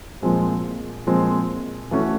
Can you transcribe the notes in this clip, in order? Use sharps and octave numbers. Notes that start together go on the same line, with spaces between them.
A#2 F3 G#3 C4
A#2 F3 G#3 C4
E3 A3 C#4 F#4